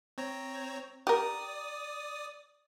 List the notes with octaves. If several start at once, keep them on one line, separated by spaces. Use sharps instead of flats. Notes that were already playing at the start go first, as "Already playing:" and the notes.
C4 C#5 A#5
G4 A#4 D5 D#6